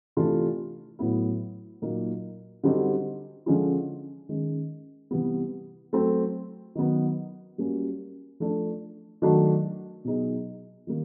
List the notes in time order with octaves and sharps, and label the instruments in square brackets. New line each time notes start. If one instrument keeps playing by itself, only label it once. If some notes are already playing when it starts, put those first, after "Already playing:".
[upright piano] C3 E3 A3 D4 F4
A2 F#3 B3 E4
A#2 F#3 A#3 D#4
D3 G3 C4 D#4 F#4
D3 F3 G#3 C#4 F4
D#3 G#3 C#4
C3 E3 G3 B3
F#3 A3 C4
D#3 F#3 B3 D#4
G3 A#3 C#4 F#4
F3 A3 D4
D#3 F#3 A3 D4 F#4
B2 F#3 B3 D#4 G#4
D#3 G3 A#3